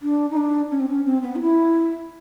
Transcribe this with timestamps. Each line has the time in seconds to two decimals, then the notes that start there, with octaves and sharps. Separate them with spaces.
0.02 D4
0.30 D#4
0.37 D4
0.71 C#4
0.80 C4
0.88 C#4
1.05 C4
1.22 B3
1.35 F4
1.40 E4